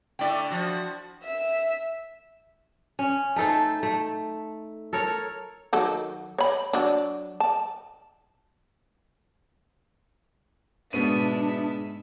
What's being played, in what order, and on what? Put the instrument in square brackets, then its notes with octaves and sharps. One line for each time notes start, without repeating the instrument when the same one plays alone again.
[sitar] D3 A3 D5 [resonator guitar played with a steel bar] E4 G5
[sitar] F3 F#4
[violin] E5
[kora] C#4
A3 D#4 A4 C5
A3
A4 A#4 C#5
[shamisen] D#3 F#3 A4
C#5 B5
F#3 D4
A5
[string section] G#2 G#3 E5 [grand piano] B2 B3 D#7 [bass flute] D4